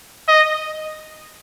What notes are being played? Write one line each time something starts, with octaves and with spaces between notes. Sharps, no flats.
D#5